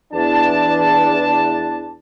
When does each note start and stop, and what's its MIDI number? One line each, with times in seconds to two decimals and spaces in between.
0.13 1.96 40
0.13 1.96 62
0.13 1.96 81